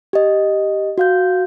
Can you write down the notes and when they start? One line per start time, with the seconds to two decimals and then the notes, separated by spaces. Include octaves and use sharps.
0.13 G4 D#5
0.98 F#4 F5 G6